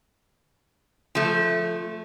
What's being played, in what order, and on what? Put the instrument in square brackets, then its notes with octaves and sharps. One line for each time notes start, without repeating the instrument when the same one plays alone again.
[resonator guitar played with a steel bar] F3 A3